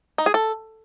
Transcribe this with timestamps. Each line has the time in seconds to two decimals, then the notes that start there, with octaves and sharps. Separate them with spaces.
0.18 D#4
0.26 G#4
0.34 A4